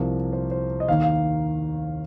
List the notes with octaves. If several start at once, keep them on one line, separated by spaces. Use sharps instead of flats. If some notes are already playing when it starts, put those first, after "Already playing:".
Already playing: C2 C3 F3 A#4
C5
C5
D#5
D#2 D#3 F5
F5